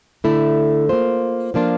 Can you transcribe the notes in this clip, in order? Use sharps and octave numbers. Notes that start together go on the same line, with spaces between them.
D3 A3 E4
A#3 F4 C5
F3 A#3 D4 F4